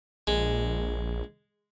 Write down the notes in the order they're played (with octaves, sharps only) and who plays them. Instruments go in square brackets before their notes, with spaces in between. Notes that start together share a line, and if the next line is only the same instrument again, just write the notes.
[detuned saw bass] A#1 [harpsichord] G#3